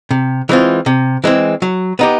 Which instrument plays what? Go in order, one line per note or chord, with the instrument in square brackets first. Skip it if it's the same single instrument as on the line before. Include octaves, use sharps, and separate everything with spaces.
[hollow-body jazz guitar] C3
E3 G#3 C4 F4
C3
E3 G#3 C4
F#3
B3 D#4 G4